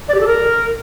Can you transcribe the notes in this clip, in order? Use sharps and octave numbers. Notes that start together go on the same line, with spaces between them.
D5
G4
A4
A#4